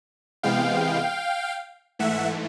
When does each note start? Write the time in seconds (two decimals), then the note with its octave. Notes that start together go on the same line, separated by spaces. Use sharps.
0.43 C3 E3 G#3 B3 F5 G5
1.99 G#2 E3 A3 E5 F#5